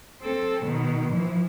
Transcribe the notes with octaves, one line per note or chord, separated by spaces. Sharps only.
C4 A4
B2 D#3
E3 F3